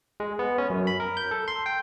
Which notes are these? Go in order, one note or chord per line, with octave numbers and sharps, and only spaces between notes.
G#3
B3
C#4
F#2
B5
A#4
G6
A4
C6
G5